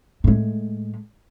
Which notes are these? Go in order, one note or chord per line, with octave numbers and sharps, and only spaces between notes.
A2 G#3